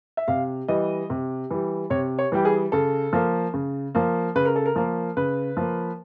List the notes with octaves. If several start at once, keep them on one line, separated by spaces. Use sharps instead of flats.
E5
C3 F5
E3 G3 D#5
C3
E3 G3
C3 C#5
C#5
E3 G3 G4
G#4
C#3 A4
F3 A#3
C#3
F3 A#3
C#3 B4
A#4
A4
A#4
F3 A#3
C#3 B4
F3 A#3